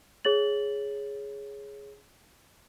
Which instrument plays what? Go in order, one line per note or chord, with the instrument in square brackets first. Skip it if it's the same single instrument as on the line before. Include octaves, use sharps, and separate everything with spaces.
[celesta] G#4 C#5 A6 F#7